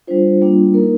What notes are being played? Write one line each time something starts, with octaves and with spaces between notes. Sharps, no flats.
G3 D4 F4 C5
G3 A#3 D4 F4
A#3 D#4 A#4